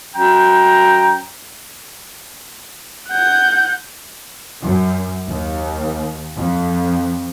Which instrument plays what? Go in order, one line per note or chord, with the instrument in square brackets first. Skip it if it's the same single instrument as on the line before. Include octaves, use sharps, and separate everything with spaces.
[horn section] F#2 G5 A#5
[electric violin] F#5 G6
[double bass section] F#2
D#2
F2